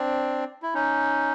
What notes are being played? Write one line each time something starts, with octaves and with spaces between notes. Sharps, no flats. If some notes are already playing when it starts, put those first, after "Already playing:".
Already playing: C4 D4
E4
C#4 D#4